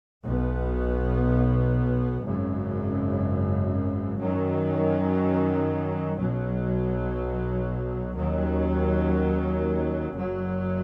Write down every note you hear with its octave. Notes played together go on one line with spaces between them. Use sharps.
B1 B2 B3
G#1 F#2 C#3
F#2 D#3 F#3 C#4
B1 B2 F#3
D#2 D#3 F#3 C#4
F#1 F#2 F#3